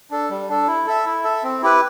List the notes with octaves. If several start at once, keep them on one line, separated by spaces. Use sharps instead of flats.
D4 A4
G3
D4 A4
E4
A4 E5
E4
A4 E5
C4
E4 G4 B4